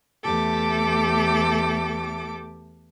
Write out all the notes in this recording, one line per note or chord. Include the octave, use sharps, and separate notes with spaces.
E2 A3 G4 A4 D6